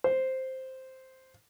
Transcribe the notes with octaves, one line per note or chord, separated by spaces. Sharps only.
C5